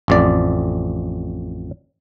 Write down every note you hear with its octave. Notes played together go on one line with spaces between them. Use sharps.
A1 F2 D5